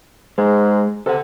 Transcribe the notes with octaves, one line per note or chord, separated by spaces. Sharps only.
G#2 G#3
C3 A4 F#5